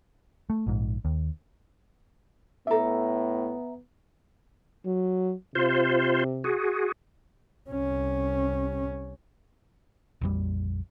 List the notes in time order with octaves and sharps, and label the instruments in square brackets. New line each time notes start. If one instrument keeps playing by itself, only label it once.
[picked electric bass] A3
A#1 G#2
D#2
[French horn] A2 [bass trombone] B3 [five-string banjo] D4 A4 [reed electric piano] E5 A#5
[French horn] F#3
[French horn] C3 [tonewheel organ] F4 C5
[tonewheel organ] F#4 G#4
[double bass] C2 C#4
[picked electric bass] A#1 F2 G3